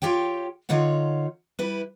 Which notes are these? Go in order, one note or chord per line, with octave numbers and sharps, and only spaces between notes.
F4 G4 C#5 G5
D3 D#4 F4 C#5 F#5
G3 E4 B4